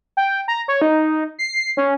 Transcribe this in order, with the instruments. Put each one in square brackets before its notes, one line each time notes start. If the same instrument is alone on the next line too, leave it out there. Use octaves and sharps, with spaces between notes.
[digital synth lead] G5
A#5
C#5
D#4
C7
C#4